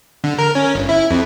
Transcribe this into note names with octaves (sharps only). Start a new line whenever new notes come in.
D3
A#4
C#4
G1
E4
F2